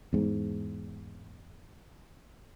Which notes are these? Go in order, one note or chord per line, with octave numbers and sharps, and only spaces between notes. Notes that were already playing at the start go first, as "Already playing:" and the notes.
E2 G#2